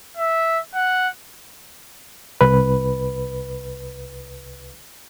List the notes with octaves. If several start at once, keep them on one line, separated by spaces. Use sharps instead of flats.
E5
F#5
C2 B4